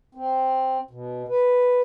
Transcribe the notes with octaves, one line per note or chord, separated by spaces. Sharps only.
C4
B2
B4